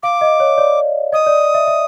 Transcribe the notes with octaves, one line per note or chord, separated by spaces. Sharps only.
F5 D6
D#5
C#5
D5
D#5 D#6
D5
E5
E5